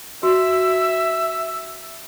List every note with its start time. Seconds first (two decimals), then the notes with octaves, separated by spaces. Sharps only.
0.23 F#4 E5 E6